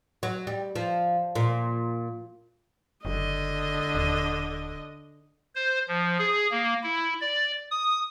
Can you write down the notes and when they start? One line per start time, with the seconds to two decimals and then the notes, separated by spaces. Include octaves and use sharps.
0.23 F#3
0.47 G3
0.76 F3
1.35 A#2
3.05 F#1 D3 D#5
3.95 D#1
5.55 C5
5.88 F3
6.19 G#4
6.51 A#3
6.83 E4
7.21 D5
7.71 D#6